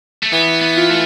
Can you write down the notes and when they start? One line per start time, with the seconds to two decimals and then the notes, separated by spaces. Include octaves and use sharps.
0.23 A3
0.32 E3 B3
0.61 B3
0.76 F4
0.90 A3